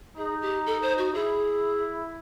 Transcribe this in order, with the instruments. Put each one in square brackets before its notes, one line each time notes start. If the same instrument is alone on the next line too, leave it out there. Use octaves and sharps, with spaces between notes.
[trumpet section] D#4 [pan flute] G#4
[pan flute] G4
A4
C5
F#4
[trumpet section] E4 [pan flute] G#4